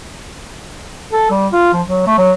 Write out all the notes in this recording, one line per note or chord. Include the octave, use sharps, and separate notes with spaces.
A4
G3
F4
F3
F#3
A3
F#3